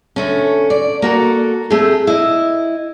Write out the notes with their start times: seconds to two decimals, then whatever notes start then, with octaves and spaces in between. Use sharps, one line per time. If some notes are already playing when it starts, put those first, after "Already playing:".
0.16 D2 A3 C#4
0.70 D5
1.02 A#3 F#4 A4
1.70 A3 C4 F4 G4 G#4
2.07 E4 D#5